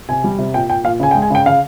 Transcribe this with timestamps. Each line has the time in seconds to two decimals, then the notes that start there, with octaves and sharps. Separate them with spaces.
0.09 C3 G#5
0.24 G3
0.39 C3
0.54 A#2 G5
0.70 A#2 G5
0.84 A#2 F5
1.00 C#3 G#5
1.11 G5
1.15 G#3
1.22 G#5
1.30 C#3 G5
1.46 C#3 F5